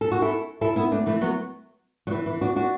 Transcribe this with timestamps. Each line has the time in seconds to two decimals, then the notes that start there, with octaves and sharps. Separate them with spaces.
0.01 A4
0.12 F#4
0.22 E4 A4
0.61 E4 A4
0.76 B3 E4
0.92 A3 D4
1.06 E3 A3
1.21 F#3 B3
2.07 F#3
2.11 E3
2.26 E3
2.41 D4 F#4
2.56 D4 F#4